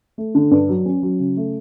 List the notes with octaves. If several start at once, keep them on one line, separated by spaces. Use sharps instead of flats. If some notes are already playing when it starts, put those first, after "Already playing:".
A3
D3
G2
F#3
C#4
F#3
C#3
A3